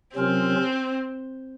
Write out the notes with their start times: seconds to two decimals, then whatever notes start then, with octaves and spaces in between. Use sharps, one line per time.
0.15 C3 F#3 C4 C#4 F4 A#4